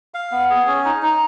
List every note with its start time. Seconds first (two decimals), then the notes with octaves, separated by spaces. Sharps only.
0.14 F5
0.32 B3
0.50 G#4
0.67 C#4
0.85 D#4
1.02 D#4